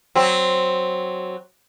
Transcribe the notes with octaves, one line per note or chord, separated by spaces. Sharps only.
F#3 C4